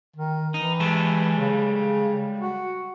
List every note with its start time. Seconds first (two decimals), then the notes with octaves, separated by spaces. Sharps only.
0.16 D#3
0.54 E3 D#4
0.80 G3 G#3 A4
1.38 C#3
2.40 F#4